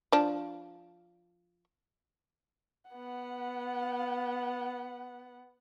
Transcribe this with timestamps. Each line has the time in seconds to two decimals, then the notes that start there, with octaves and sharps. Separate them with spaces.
0.12 F3 D4
2.91 B3 F#5